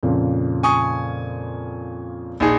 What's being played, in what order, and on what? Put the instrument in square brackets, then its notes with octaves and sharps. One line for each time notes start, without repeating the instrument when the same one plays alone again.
[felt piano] F2 A#2 C#3
[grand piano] G#5 C#6 D#6
A#1 D#4 G#4